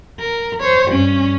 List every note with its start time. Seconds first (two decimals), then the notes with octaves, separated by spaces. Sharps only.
0.20 A#4
0.61 C5 C#5
0.91 G2 C#4